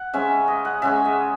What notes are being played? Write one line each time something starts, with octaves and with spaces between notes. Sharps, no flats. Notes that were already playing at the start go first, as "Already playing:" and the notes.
Already playing: F#5
C#3 G#3 C#4 E5
D#5
F#5
C#3 G#3 C#4 E5
D#5